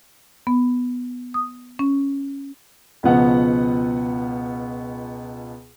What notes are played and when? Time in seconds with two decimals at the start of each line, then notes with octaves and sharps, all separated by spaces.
0.47 B3
1.34 D#6
1.79 C#4
3.03 C#2 B2 F3 B3 F#5